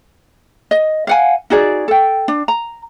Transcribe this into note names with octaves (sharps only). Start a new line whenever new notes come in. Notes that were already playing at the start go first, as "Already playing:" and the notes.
D#5
F5 F#5 G#5
D#4 F#4 G#4 D5
A4 G5
D4
A#5